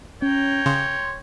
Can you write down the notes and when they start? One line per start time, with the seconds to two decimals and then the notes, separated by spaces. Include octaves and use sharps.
0.22 C#4 C#5 G5 A#5
0.66 C#3 C6